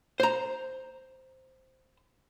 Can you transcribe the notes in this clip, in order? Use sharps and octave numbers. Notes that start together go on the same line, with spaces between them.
C5 A#5